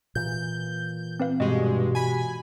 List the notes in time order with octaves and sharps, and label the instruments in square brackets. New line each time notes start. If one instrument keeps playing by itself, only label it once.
[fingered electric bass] A#2 E3 [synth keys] G6
[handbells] C4 B4 F5
[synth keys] G2 G#3 [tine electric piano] B2 F#4 G4 [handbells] D#5
[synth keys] G#5 B5